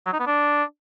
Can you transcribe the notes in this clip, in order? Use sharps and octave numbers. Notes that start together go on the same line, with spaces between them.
F#3
D#4
B3
D4